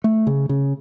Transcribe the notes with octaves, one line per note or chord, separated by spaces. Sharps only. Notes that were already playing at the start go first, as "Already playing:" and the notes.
A3
C#3
C#3